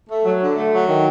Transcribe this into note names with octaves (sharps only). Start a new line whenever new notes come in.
A3
F#3
D3
A3
F#3
D#3